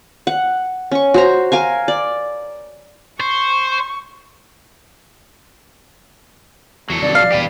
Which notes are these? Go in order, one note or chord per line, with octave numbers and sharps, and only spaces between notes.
F#5
C#4 C#6
F#4 C5 A#5
A#4 F5 G#5
D5
C5 C#6
E2 F#3 A4
G2 C3 D#3 D5
A#1 F3 F5
D#1 E2 B2 G4 B4